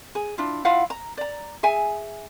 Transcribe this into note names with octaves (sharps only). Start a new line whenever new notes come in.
G#4
D4 E4 F4
E4 F4 F5 F#5
A#5
D5 A#5
G#4 E5 G#5